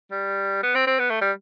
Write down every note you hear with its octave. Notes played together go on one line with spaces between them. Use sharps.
G3
B3
C4
C4
B3
A3
G3